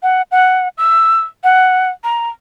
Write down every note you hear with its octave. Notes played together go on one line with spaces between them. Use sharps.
F#5
F#5
E6
F#5
A#5